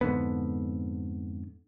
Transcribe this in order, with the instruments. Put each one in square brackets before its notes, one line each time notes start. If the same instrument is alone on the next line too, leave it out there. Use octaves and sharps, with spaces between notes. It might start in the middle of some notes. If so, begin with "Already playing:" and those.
[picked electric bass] F2 G#2 D3 B3